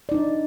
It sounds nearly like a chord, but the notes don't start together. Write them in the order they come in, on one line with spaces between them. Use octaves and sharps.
D5 D#4 D4